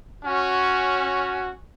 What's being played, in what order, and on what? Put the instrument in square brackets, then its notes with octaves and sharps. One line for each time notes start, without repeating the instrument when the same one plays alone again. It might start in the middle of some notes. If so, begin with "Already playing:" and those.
[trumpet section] C#4 F#4